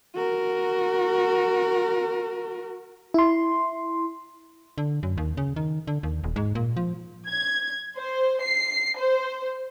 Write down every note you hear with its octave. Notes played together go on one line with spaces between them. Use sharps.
F#4 A#4
E4 C6
D3
F#2
D#2
C#3
D#3
D3
D#2
D#1
G#2
A#2
F3
G#6
C5
C7
C5